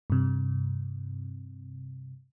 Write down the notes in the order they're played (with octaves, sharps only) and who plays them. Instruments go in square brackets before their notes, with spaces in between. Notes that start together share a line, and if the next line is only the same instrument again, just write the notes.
[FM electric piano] G2 C3